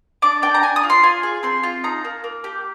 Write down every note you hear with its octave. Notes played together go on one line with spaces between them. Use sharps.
D4 D6
D4 G5
A#5
D4 G#5
D#6
F4
C6
F4 G#5
G#4
C4 C6
F4
D#4 A#5
A#3
A#3
G4